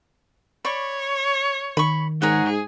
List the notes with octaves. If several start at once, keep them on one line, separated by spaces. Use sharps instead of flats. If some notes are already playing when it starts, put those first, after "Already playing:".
C#5 D5 B5 C#6
D#3 B5 C#6
G#2 G#4 A#4 C#5 F#5